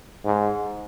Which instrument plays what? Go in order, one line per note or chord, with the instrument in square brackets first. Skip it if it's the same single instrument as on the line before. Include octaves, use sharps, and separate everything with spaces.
[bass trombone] G#2